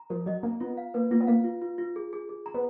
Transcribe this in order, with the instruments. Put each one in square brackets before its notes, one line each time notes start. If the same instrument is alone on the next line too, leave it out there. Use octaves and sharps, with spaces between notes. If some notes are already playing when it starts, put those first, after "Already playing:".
Already playing: [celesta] A#5
[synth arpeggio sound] F3 [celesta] A#4
[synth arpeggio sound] F#3 [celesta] D#5
[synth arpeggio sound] A#3 [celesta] A#5
[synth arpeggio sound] B3 [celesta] F4
[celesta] F5
[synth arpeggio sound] A#3 [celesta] B4
[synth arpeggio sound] A#3 [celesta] F4
[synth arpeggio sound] B3
[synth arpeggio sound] A#3 [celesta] F5
[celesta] F4
F4
F4
G#4
G#4
G#4
A#5
[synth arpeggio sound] B3